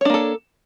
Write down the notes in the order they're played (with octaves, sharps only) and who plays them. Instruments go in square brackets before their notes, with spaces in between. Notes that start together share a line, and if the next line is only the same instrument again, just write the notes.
[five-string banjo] C#5
D4
A#3
A4